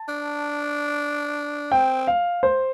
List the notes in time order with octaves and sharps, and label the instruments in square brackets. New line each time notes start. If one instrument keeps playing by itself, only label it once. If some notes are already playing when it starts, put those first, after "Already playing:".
Already playing: [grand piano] A5
[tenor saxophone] D4
[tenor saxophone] C4 [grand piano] G5
[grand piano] F5
C5